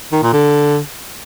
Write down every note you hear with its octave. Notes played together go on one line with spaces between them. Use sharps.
D#3
A#2
D3